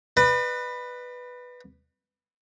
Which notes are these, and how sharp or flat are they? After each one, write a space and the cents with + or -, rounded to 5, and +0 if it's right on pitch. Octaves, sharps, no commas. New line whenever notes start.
B4 +0 D5 +45